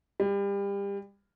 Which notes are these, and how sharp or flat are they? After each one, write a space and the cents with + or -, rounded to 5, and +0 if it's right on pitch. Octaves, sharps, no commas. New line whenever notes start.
G3 +30